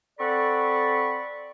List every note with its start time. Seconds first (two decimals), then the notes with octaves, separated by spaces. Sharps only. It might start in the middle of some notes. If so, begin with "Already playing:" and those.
0.19 C4 A4 D5 F#5 B5 C#6